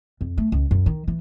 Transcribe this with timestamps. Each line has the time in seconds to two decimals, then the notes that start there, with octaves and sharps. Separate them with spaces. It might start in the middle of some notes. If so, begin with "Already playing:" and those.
0.21 F2
0.38 A3
0.52 C#2
0.71 F#2
0.86 D#3
1.08 E3